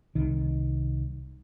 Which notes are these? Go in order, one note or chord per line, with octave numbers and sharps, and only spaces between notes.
C2 D#3